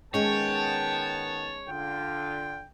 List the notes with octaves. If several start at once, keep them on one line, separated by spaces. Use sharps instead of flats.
D#3 G#3 B3 C#4 C#5 G5 A5
D3 F4 G5